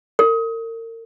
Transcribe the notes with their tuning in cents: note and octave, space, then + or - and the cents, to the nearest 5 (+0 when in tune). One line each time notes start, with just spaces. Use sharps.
A#4 -40